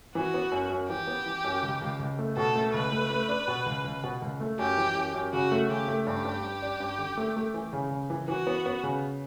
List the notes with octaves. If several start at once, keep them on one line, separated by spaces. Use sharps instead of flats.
E3 F#4
B3
F#2
F#2
E3 G4
B3
E3
F#2
C#2
C#2
C#2
A3
B2 A4
A3
C#2 B4
A3
A3
D4
B2
C#2
C#2
B2
C#2
A3
F#2 G4
E3
F#2
F#2
C#3 F#4
A3
C#3 G4
A3
G2 G4
G2
G2
D4
G2
D3
A3
A3
E3
C#3
C#3
E3
E3 F#4
B3
B3
C#3